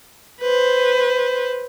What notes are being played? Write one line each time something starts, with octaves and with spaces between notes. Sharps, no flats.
B4 C5